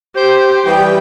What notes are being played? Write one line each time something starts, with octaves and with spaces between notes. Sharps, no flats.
G4 C5
E3 G3 B3 G5